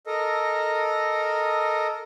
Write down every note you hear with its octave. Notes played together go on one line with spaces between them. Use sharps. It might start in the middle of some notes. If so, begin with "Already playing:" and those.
A4 A#4 D#5